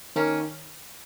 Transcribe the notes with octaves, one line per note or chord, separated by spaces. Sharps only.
D#3 A#3 C#4